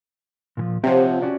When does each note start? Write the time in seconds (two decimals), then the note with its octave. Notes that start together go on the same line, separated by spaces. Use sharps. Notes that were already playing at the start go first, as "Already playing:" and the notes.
0.57 A#2 E3 F3
0.84 C3 F3 C4 C#5 F#5
1.22 C#4 F#4 D5